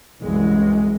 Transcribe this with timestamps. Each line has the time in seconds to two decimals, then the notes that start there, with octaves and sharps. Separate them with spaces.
0.22 C2 F#2 E3 G#3